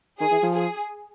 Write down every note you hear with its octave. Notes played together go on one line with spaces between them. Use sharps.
D#3 G#4
E3
F3
G#4